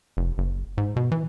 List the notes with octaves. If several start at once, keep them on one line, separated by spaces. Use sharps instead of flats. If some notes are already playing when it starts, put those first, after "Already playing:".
F1
F#1
G#2
B2
E3